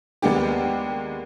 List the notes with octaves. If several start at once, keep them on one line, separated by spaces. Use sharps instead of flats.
D#2 G#3 A#3 B3 D4 G4